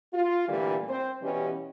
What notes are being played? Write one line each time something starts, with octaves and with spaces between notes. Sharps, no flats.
F4
A#2 D3 E3 G3 A3
C4 C5
B2 E3 G3 C#4 G4